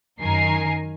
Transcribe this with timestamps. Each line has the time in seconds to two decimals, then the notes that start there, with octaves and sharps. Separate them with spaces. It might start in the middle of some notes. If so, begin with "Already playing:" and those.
0.20 F#2 D#3 A#4 G#5 A#5 C7